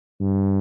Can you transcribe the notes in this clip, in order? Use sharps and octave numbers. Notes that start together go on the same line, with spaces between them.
G2